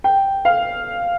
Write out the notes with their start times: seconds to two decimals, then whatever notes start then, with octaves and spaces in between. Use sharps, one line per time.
0.04 G5
0.45 F5